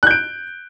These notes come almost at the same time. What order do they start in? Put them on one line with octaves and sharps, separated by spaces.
F#6 G6 D7